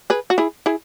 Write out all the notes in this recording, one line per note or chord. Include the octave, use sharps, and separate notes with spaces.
G#4 B4
F#4
E4 G#4
E4 G#4